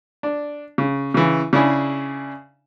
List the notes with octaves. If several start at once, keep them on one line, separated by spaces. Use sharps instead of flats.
D4
C#3
C#3 E3
C#3 D4 E4 G#4